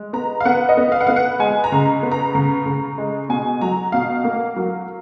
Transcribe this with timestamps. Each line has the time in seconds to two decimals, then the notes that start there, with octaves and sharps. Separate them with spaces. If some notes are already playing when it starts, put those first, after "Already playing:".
Already playing: G#3
0.13 B3 A#5
0.40 F5
0.45 B3 F#5
0.69 D#5
0.77 B3
0.92 F5
1.00 F#5
1.07 B3 F5
1.16 F#5
1.39 G#3 G#5
1.64 A#5
1.72 C#3
2.03 B3
2.12 A#5
2.35 C#3
2.66 C#3
2.98 G#3
3.29 B2 G#5
3.61 F#3 A#5
3.92 B2 F5
4.24 A#3
4.56 F#3